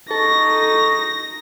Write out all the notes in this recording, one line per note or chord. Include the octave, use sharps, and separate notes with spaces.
D#4 A4 C#6 A#6